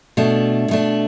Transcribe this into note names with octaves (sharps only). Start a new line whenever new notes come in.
B2 A3 D4
B2 A3 D4